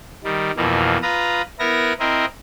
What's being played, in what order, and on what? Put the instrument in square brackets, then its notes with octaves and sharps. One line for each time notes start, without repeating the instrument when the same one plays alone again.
[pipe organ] D#3 G3
F2 B2 E3 A#3
F4 B4 A#5 D#6
B3 E4 A#4 A#6
C4 E4 A#4 D#5